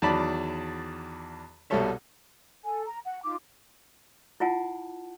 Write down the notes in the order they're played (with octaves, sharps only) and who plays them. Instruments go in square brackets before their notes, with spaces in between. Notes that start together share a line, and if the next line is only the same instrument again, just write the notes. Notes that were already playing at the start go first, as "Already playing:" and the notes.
[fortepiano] E2 D#3 F#3 D5 A5 B5
C2 B2 G3 A4 C#5 E5
[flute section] A4 G#5
A#5
F#5
D#4 F4 D6
[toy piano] E4 F4 F#5 G#5 A5